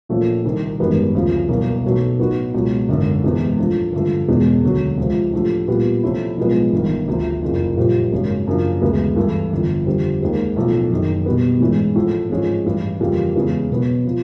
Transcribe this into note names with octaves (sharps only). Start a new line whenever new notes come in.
A#1 A#2 F3 A3 C#4
C2 C3 D#3
G#1 F#2 D#3 G3 B3
D2 C#3 F3
C2 B2 F#3 A#3
B1 B2 F#3 A3
A2 F#3 B3 D#4 F#4
C#2 B2 F#3
G#1 F#2 D3
E1 E2 C3 E3 G#3
A2 F3 A3 D4
G2 D3 F3 A3
E1 E2 B2 G#3 C#4
D2 D3 F#3
C#2 C3 F3
A2 F3 A3 D4 G4
A#2 G3 B3
C3 F3 A3 C#4 E4
B1 A2 F3 G#3 B3
G1 G2 D#3
D2 C3 F3
F#1 F2 C#3
A#1 A#2 G3 C4
G#1 F#2 C#3 F#3
F#2 C#3 F3 A#3 D4
D2 C#3 E3 G#3 B3
G2 E3 A3
G1 F2 D3
F2 D3 G3 C4
D#2 D#3 G#3 C4
B1 A2 F3 A3
F#1 F#2 D#3
B2 G3 B3
A1 G#2 E3 G#3 C#4
A1 A2 F3 A3
G#1 G#2 F3 G#3 C#4
A1 G2 E3
F2 C#3 E3 G3 A#3
E2 C#3 E3 G#3
B2 F#3 B3
C3 F3